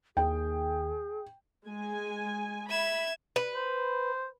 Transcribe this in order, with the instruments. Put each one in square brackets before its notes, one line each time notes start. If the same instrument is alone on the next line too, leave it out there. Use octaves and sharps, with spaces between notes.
[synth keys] D#2 [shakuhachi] G#4 [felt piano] G5
[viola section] G#3 G#5
[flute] E5 [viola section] B5 [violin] G#6 E7
[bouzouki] B4
[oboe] C5